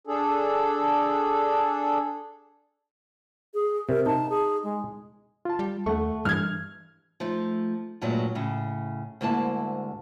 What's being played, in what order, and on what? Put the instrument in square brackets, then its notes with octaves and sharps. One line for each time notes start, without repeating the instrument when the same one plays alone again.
[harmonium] D4 G#4 A4
[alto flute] G#4
[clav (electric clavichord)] C3 [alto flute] A#4
[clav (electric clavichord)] D#4 [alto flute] A5
[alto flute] G#4
G#3
[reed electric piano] F4 A5
[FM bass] G3
[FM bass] D#2 [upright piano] A3 [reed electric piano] F#5 C#6
[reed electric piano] G2 [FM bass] E3 [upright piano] F6 G#6
[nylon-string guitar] F3 A3 D#4
G2 A#2 F#3 G#3 A3
A2 C#3
D2 G#2 A#3 E4 A5